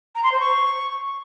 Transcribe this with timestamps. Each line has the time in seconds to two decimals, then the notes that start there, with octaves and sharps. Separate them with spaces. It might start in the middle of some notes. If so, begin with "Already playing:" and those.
0.15 A#5
0.23 C6
0.32 C5
0.40 C#6